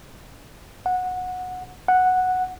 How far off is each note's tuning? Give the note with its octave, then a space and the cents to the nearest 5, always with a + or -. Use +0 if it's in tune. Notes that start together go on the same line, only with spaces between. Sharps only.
F#5 -15
F#5 -5